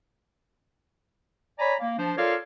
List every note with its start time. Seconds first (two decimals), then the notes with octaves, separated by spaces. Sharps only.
1.59 C#5 D5 G#5 A#5 B5
1.80 A#3
1.98 F3 D4 C5
2.17 F4 A4 A#4 C#5 D5 F5